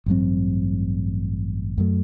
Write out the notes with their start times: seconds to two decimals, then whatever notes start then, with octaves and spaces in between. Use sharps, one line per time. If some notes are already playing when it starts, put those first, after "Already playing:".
0.06 A1 G2 F#3 C4
1.78 F#2 F#3 A3